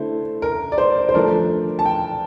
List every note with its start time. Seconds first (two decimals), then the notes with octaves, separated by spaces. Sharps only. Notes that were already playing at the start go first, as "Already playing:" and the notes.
Already playing: D3 A3 E4 C5
0.42 A#4
0.72 D5
0.78 C5
1.09 C5
1.14 D3 F3 A3 D4 A#4
1.79 A5
1.85 G5